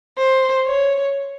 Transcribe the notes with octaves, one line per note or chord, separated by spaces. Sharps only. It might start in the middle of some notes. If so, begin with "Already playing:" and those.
C5
C#5